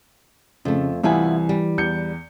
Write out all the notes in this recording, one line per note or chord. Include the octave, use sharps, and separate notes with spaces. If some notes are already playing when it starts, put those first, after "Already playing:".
F2 C#3 A3
C2 E3 B3 E4 F4 G#5
G3
E2 G6 C#7